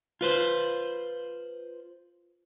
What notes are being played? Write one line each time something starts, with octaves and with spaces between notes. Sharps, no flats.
F4 B4 C5